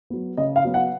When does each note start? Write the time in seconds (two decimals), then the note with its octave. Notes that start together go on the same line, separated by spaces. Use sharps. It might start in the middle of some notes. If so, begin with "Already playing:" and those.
0.10 F#3 B3
0.37 C#3 D#5
0.56 F5
0.65 F#3 B3
0.74 F#5